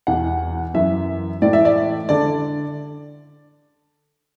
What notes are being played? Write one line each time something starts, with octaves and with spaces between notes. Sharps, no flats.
E2 B2 F#5
F#2 E3 E5
A2 E3 D5
E5
D5
D3 D5